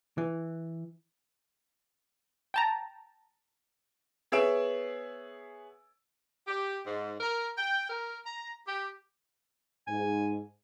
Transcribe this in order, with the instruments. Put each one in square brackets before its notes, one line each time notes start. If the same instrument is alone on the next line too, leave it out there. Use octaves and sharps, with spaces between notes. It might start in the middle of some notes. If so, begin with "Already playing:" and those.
[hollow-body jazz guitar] E3
[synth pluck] G5 A5 A#5
[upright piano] B3 G#4 C#5 E5 D7 E7
[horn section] G4
G#2
A#4
G5
A#4
A#5
G4
[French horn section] G#2 [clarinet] G#5